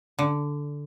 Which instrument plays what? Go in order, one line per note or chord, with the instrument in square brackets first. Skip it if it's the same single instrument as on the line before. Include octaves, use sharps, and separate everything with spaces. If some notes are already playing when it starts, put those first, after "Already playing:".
[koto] D3